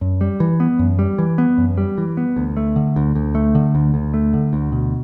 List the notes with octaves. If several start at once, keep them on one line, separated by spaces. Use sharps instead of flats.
F#2
G3
E3
B3
F#2
G3
E3
B3
F#2
G3
E3
B3
D2
A3
D3
D2
D2
A3
D3
D2
D2
A3
D3
D2
B2